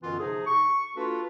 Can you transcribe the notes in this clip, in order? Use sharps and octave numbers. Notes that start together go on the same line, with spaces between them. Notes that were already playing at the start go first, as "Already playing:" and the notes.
F#2 B2 D3 E3 B3 F4
C3 F3 D#4 G#4
C#6
A#3 D4 F4 F#4 A4 B4